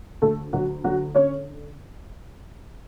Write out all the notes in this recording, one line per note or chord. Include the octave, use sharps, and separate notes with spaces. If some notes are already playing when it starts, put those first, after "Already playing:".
D2 A3 A4
D2 F#3 F#4
D3 F#3 F#4
D3 C#4 C#5